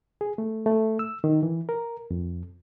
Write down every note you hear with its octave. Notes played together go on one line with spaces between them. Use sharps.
G#4
A3
A3
E6
D#3
E3
A#4
F2